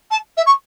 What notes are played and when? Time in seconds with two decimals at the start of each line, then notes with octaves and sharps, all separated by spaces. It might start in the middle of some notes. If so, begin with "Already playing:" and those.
0.11 A5
0.37 E5
0.46 C#6